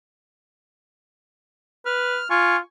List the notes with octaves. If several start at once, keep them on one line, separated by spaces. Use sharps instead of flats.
B4 F6
F4 G#5 C#6